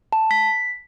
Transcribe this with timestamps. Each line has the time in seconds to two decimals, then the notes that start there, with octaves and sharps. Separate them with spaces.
0.12 A5
0.31 B6